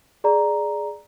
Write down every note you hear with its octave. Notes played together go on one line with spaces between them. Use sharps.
G#4 D5 A#5